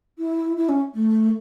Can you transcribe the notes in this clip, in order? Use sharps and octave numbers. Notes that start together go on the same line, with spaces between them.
E4
E4
C#4
A3